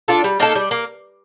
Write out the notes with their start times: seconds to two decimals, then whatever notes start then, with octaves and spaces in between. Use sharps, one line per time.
0.08 D4 F4 A4
0.24 G3
0.40 A#3 D#4 A4
0.55 G3
0.71 A#3